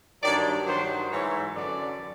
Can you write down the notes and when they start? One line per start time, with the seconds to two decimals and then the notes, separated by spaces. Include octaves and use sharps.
0.21 G2 D#3 F#3 D5
0.66 G2 D#3 F#3 C5
1.10 G#2 E3 C#5
1.55 F#2 D3 F#3 D5